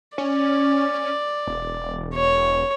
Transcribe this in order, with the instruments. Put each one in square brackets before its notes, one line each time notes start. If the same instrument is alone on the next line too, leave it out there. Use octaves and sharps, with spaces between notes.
[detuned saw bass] C#4 [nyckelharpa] D5
[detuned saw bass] E1
[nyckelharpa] C#5